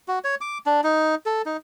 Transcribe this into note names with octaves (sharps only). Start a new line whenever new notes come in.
F#4
C#5
D6
D4
D#4
A4
D#4